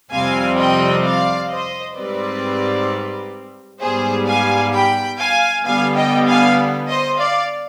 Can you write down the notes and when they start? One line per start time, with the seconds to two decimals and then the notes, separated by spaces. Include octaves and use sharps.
0.11 F2 C3 G3 C4 F5 G#5
0.57 D#5 G5
1.04 D5 F5
1.50 C5 D#5
1.96 G#2 G3 C4 B4 D5
3.81 G#2 G3 B3 G#4 C5
4.27 F5 G#5
4.73 G5 B5
5.19 F5 G#5
5.65 D3 G3 B3 F5 G#5
5.96 D#5 G5
6.26 F5 G#5
6.88 C5 D#5
7.19 D5 F5